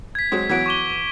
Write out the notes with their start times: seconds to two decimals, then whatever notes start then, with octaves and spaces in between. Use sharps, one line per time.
0.15 G#6 B6
0.32 F#3 G#3 C4
0.49 E3 F#3 B3 G#6 D7
0.66 C#6 D6 G7